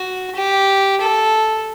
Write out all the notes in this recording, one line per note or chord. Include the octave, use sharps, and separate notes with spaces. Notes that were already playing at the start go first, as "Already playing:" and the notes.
Already playing: F#4
G4
A4